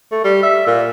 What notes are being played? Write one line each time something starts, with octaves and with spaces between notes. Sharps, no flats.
A3
G3
E5
A#2